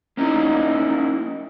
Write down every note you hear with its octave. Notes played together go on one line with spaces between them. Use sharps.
A#3 C#4 D#4 E4